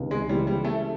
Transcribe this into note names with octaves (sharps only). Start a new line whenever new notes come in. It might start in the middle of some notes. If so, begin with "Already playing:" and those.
Already playing: C#2 C3 D#3
G#3
C#3 E3 G3 G#3 C4 E4
G3
A3